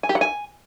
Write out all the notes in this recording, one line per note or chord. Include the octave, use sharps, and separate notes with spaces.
G#5
G4
F#5
G#5